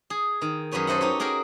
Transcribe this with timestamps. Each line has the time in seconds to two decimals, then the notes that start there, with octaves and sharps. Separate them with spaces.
0.10 G#4
0.42 D#3
0.72 F#2 G#4 B4 C#5 G#5
0.87 A4 C5 D#5 E5 F#5
1.01 D#4 G4 C#5
1.20 F#4 G#4 A#4 E5 G5